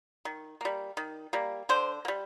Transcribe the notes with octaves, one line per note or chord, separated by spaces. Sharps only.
D#3
G3 A#3
D#3
G3 A#3
D3 C5
A#3
G3